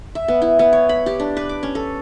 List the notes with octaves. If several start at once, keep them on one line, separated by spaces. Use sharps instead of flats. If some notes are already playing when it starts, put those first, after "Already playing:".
E5
B3
E4
B3
C#5
B5
G4
D4
B4
D6
C#4
A4